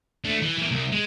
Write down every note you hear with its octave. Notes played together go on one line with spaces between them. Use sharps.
A3 D4
E3
E3 A#3
C2
G#3